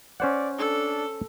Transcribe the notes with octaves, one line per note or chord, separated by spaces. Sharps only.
C#4 C5 D5 F#5
D4 A4